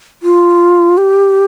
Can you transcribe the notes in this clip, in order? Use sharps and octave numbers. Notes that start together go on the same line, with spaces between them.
F4
G4